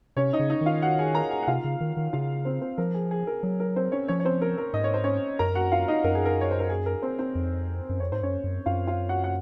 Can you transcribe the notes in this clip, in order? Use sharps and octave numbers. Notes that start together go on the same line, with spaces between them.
C3 C#4 C#5
D#4 D#5
C#3
D#4 D#5
D#3
F4 F5
F#4 F#5
G#4 G#5
A#4 A#5
G#4 G#5
F#5
C3 F4 F5
C#3
D#3
D#3
C#3 F4 F5
C4 C5
C4 C5
F3 A#4
G#4
G#4
A#4
F#3 G#4
A#4
C4 C5
C#4 C#5
F3 C#4 C#5
C#5
C4 C5
A#4
A#4
G#2 D#5
C#5
C5
C#4 C#5
F#2 A#4 A#5
F#4 F#5
F4 F5
D#4 D#5
F#2 A#4
G#4
A#4
C#5
C5
A#4
G#4
A#4
C4 C5
C4 C5
F2
F#2
F2 C#5
G#2 C5
F#2 C#4 C#5
F#2
F#2 F4 F5
F4 F5
F#4 F#5
F#5